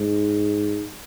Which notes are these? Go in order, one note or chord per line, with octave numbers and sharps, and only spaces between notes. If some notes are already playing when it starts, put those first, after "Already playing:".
Already playing: G#2